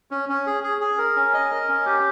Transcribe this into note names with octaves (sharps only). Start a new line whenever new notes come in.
C#4
C#4
G#4
G#4
G#4
A#4
C#4
D#5
A#4
C#4
G4